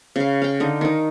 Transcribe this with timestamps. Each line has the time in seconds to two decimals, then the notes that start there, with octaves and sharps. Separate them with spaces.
0.16 C#3 F5
0.42 F5 G5
0.60 D3 D#4
0.81 D#3 D#4